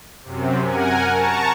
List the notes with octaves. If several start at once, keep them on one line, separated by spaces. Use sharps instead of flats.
F#2 C3
A#4 F#5 G#5
A5 A#5 C#6